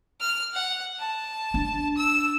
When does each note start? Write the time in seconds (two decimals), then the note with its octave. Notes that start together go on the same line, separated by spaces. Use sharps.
0.21 F6
0.54 F#5
1.00 A5
1.54 D4
1.97 E6